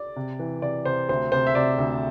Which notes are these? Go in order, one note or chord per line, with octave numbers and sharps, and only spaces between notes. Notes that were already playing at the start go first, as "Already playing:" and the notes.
Already playing: D5
C3
E3
C3 D5
C3 C5
D2 C5
C3 C5
E5
C3 D5
D2